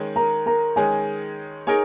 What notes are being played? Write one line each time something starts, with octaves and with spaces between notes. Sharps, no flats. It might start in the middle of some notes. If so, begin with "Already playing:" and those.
Already playing: D#3 G#3 C#4
A#4 A#5
A#4 A#5
D#3 G#3 C#4 G#4 G#5
D#4 G#4 A#4 C#5 G#5